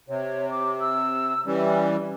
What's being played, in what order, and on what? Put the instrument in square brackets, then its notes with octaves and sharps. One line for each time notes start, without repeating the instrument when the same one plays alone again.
[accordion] C3 [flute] C#5
[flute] D6
E6
[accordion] E3 G3 [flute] C#4